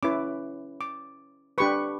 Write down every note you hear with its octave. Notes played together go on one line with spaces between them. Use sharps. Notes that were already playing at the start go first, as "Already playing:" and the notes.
C#4 E4 B4 D6
D6
D4 G4 B4 C#6